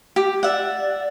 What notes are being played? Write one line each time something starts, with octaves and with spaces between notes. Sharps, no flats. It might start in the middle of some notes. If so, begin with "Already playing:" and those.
G4
D5 E5 F#5